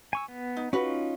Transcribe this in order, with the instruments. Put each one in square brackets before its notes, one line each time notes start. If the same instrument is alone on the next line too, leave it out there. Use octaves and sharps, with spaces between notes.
[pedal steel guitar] G#5 C#6 E6
B3
[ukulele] D#4
[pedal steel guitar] C#4 D#4 F4 [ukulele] F#4 B4